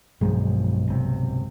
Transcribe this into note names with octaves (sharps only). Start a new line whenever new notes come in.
B1 G2 D#3 F3 G#3
G1 C3